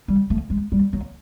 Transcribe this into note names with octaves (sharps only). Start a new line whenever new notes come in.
G3
A3
G#3
G3
F#3